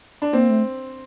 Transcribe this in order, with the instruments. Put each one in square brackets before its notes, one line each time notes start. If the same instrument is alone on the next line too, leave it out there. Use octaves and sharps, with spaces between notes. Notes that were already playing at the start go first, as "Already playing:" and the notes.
[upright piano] D4
[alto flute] A#3 [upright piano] C4
[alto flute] A3